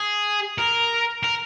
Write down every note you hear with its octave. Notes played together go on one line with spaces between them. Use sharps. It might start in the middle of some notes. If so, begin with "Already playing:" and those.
Already playing: G#4
A#4
A#4